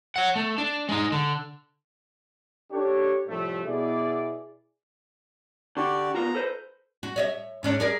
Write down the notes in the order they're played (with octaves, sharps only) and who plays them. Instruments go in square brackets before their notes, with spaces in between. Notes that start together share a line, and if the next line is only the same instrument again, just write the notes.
[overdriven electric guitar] C#5 F#5
A3
D4
G#3 D#4
D3
[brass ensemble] D4 G4 A4 C#5
A2 C3 F3 G3 A3
B2 E4 G#4 D5
[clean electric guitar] D3 [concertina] F#4 G4 D5
[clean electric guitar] B3 F4 F#4 [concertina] A#5
[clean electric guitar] A4 B4 C5
[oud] F#4
C#5 D#5 E5
G#2 C#4 D4
G#4 A#4 D5